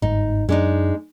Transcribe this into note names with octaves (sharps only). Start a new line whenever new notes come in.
G1 G#2 D#4
F#2 F#3 G#3 D4 D#4